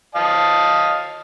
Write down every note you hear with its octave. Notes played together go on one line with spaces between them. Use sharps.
D#5 F5 A5